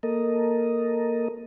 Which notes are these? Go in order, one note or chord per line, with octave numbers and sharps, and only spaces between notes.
A#3 A4 A#4 D#5